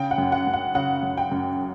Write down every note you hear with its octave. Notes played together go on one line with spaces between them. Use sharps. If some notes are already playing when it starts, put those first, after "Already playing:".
Already playing: C#3 G5
F#5
F#2
F#5
F#2
F#5
C#3 F#5
F#2
G5
F#2